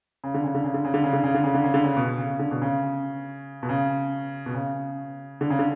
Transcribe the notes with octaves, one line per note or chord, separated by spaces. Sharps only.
C#3
D3
C#3
D3
C#3
D3
C#3
D3
C#3
D3
C#3
D3
C#3
D3
C#3
D3
C#3
B2
C#3
D3
B2
C#3
B2
C#3
B2
C#3
D3
C#3
D3